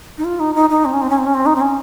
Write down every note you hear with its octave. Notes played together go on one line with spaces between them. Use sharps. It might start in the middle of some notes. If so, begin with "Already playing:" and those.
D#4
F4
D#4
D#4
D#4
C4
C#4
C4
C#4
C4
C#4
C4
D#4
C4
C#4